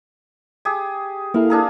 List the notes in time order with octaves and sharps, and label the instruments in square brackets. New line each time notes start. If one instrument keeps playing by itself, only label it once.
[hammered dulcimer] G4 G#4
[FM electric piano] A#3 E4 A4 [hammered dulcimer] F5
[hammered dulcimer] D4 G#4 A#4